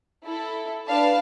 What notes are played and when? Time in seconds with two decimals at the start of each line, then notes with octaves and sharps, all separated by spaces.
0.25 E4 A4
0.88 D4 B4 F5 A5